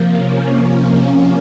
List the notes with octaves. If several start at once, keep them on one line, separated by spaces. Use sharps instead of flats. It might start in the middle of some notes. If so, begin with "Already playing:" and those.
Already playing: C3 F3 A#3
C#4